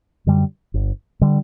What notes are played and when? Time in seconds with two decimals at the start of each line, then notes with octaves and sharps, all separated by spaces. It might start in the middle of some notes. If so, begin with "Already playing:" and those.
0.27 F#2 D3 G3
0.74 G1
1.21 D3 G3